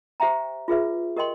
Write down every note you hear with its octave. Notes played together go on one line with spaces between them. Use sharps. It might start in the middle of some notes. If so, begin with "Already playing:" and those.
G4 C5 E5 G5 A#5
F4 G#4 B4 E5
G4 A#4 D#5 G5 C6